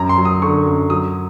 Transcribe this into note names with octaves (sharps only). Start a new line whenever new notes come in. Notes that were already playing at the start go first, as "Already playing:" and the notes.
Already playing: F#2 A#5
C6
F#3
D#6
D3 C#6
F#2
F#3 D#6